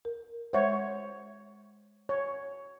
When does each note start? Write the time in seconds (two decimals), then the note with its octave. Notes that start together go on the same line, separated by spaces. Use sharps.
0.05 A#4
0.53 G#3 C5 C#5 E5 F#5
2.09 C#5